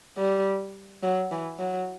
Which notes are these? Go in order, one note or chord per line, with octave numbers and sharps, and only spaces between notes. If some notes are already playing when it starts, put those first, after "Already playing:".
G3
F#3
E3
F#3